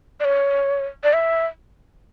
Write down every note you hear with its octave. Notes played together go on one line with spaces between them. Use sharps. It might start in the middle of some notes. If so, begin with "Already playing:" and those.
D5
C#5
D5
E5